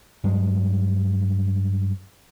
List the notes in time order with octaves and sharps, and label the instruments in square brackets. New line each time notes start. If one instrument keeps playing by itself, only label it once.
[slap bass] G2 F#3 G#3